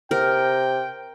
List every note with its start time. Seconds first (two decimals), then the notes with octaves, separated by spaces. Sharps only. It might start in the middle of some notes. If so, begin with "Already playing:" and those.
0.11 C3 A#4 G5